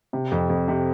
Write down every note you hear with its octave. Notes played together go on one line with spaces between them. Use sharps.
C3
F2
F2
C3